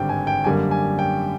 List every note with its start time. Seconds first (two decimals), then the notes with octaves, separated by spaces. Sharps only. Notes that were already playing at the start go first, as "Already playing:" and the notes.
Already playing: G#1 G2 D3 G3 G5
0.09 G#5
0.27 G5
0.44 F#2 D3 G3 A#3 G#5
0.71 G#5
0.99 G5